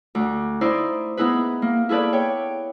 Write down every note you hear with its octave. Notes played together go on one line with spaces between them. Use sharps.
D2
D#4 E4 C5 D5
B3 D#4 E4 G#4 B4
A#3
E4 G#4 A4 B4 D5
C#5 G5